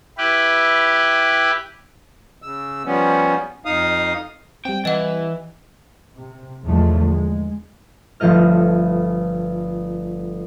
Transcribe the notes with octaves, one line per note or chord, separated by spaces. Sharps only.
E4 G4 B4
C#3 E6
F3 G3 B3 C#4
F2 D#4 F5 D#6
G3 C4 G5
E3 D#5 F#5
C3
E2 A2 D3 F3 G#3 A3
G#3
G1 F3 A3 D#5 F6